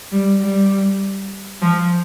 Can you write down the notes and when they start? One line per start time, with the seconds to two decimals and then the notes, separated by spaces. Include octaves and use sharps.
0.11 G3
0.41 G3
1.62 F3